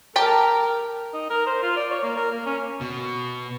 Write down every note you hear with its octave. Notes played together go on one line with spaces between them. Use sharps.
G4 A#4 G5 A5
D#4
A#4
C5
F4
D5
C#5
A#3
A#4
A#3
C#4
B2